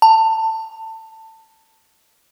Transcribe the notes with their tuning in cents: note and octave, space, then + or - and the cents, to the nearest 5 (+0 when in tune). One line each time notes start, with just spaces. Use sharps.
A5 +20